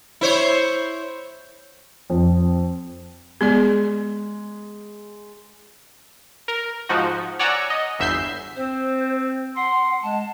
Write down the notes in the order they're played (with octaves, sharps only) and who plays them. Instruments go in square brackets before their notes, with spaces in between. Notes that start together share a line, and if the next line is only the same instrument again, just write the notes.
[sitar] E4 C5 C#5
[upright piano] F2
[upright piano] G#3 [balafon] B3 G#4 D5
[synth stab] A#4
G#2 F3 D#4 F#4
C#5 D5 F#5 G#5 A#5 E6
D#5
G1 E2 E5 E6 G6 C7
[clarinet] C4 [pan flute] C5
[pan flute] F#5 [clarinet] C6
[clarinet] G#3 [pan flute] A5